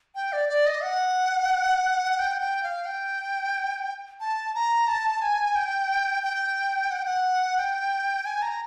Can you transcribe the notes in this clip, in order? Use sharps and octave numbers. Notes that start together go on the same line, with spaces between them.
G5
D5
D5
D#5
F#5
G5
F#5
G5
F5
G5
A5
A#5
A5
G#5
G5
G5
F#5
G5
F#5
G5
G#5
A#5